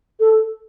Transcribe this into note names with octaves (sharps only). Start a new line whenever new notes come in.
A4